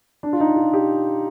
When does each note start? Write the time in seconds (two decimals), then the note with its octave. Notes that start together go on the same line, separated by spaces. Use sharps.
0.23 D4
0.33 F4
0.40 D#4
0.56 F4
0.73 G4